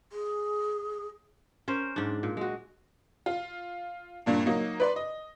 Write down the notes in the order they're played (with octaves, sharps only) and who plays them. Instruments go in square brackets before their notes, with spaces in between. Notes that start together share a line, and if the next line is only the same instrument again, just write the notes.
[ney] G#4
[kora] C#4 A#4 C5
G#2 D4
A#2
G#3 F#4
[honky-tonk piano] F4
G2 A#2 A#3 D4
F#3 A#3 D#4
B4 D5 C6
D#5